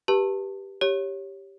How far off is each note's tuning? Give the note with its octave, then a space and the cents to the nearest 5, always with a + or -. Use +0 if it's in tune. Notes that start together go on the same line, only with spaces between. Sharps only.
G4 +0 B4 -25 A5 +20
G4 +0 C#5 +0